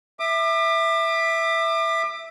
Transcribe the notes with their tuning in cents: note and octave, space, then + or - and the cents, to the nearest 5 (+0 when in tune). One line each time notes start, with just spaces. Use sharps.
E5 +0 D6 +35